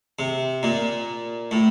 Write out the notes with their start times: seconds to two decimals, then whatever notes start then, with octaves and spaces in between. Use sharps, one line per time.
0.19 C3
0.63 A#2
1.51 A2